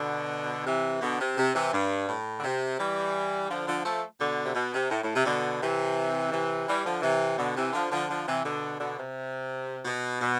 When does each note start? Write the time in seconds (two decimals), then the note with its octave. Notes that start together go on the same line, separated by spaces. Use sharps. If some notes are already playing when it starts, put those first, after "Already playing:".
Already playing: B2 D3
0.66 C3 E3
1.01 B2 D3
1.20 C3
1.38 C3
1.55 C3 E3
1.73 G2
2.09 A2
2.38 D3
2.44 C3
2.79 E3 G3
3.49 D3 F3
3.67 D3 F3
3.84 F3 A3
4.20 B2 D3
4.45 C3
4.55 B2
4.74 C3
4.90 A2
5.03 A2
5.15 C3
5.25 B2 D3
5.62 C3 E3
6.32 C3 E3
6.67 E3 G3
6.85 D3 F3
7.02 C3 E3
7.38 B2 D3
7.56 C3 E3
7.73 D3 F3
7.91 D3 F3
8.09 D3 F3
8.27 C3 E3
8.44 B2 D3
8.79 B2 D3
8.98 C3
9.85 B2
10.21 B2